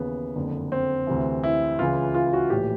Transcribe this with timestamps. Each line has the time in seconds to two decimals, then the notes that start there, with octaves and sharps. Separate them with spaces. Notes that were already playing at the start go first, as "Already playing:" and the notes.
Already playing: D#2 C#3 E3 B3
0.36 F#1 F2 D3
0.72 C4
1.07 D2 C3 E3
1.43 E4
1.79 C#2 C#3 E3 F4
2.14 F4
2.33 F#4
2.50 A#1 A2 E3 G4